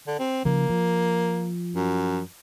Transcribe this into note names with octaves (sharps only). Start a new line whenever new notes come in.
D3
C4
C#3 F3 A#3
F3
F#2